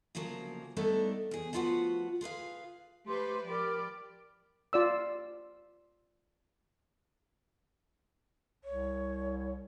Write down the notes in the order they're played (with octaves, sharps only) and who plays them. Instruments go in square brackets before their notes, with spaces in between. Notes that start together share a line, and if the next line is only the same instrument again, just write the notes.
[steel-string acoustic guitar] D2 C#3 F3 F#3 A#3
G3 A3 B3 D4 D#4 A4
E2 G#4
F3 A3 F4 F#4 B4 F#5
F4 G#4 B4 F5
[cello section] A3 B4 C5 [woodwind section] G4 [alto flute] C6
[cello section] F3 G4 D5 [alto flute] A#4 [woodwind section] B5 D6
[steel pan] F4 D5 E6
[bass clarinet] C2 [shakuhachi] C#5